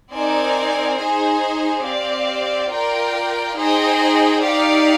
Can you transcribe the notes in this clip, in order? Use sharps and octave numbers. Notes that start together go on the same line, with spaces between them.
C4 D#4 A#4 D5 G#5
D#4 G#4 C5 D#5 G#5
C4 G4 D5 F5
F4 A#4 D5 G5
D#4 G#4 C5 D#5 G5
D#4 G4 D5 F5